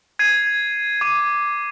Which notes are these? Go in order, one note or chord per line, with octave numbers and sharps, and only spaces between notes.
G#6 C7 D#7
D6 G#6 D#7